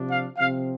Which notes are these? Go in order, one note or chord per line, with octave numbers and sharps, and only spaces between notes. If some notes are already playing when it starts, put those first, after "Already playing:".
Already playing: C3 F3 D4
F5
C3 F3 C4 F5